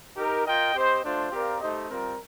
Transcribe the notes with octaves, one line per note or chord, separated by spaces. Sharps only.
D#4 G4 A#4
F4 A#4 D#5 G5
C4 G4 C5 D#5
A3 D4 F4 C5
C4 G4 A#4 D5 F5
A3 D#4 G4 C5 D#5
G3 C4 F4 A#4